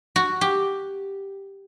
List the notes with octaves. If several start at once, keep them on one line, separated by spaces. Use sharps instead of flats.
F#4
G4